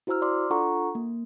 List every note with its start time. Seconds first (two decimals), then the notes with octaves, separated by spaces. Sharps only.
0.07 E4 F#4 C5 A#5 E6 F6
0.22 D5 C6 D6
0.50 D4 F4 A4 F#5 A#5 C#6
0.95 A#3